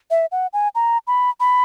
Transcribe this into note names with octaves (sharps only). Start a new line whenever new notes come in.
E5
F#5
G#5
A#5
B5
B5